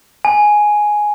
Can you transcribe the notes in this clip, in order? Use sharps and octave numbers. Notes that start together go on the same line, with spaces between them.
G#5